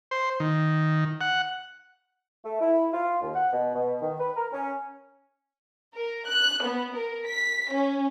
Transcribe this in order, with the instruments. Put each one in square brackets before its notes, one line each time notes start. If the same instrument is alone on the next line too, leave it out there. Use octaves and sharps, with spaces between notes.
[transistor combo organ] C5
D#3
F#5
[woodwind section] A3
E4
F4
D#2
F#5
B2
B2
D#3
B4
A#4
C#4
[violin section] A#4
F#6
B3
A#4
B6
C#4